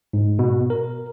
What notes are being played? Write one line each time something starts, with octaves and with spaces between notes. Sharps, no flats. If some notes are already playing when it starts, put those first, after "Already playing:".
G#2
B2
A#4